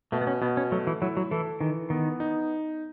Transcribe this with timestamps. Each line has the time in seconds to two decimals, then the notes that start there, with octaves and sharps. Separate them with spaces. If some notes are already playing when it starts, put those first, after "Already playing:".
0.12 B2 A3
0.21 B3
0.27 C#4
0.41 B2 B3
0.57 C#4
0.72 F#3 A3
0.87 E3
1.02 F#3 E4
1.17 F#3
1.31 E3 A4
1.61 D#3 E3
1.90 D#3 B3
2.20 D#4